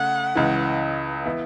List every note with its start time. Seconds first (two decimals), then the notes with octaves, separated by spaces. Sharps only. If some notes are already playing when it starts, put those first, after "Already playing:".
Already playing: C#3 A3 F#5
0.35 C#2 C#3 E3
1.26 E3 B3 E4